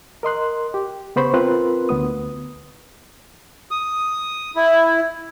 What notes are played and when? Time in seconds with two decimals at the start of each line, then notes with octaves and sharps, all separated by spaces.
0.23 A#4 D#5 C6 F#6
0.74 G4
1.16 C#3 B3 C5 B5 C#6
1.34 C4 F4 A#4 B4 C6 F#6
1.89 D2 B3 D#6
3.71 D#6
4.56 E4